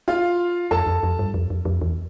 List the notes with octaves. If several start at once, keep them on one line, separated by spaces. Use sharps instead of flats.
F4 F5
F2 A4 A5
F2
F2
G2
F2
F2
F2
E2